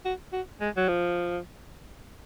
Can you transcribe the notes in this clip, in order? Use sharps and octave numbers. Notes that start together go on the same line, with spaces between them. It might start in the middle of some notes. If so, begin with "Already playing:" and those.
F#4
F#4
G#3
F#3
F3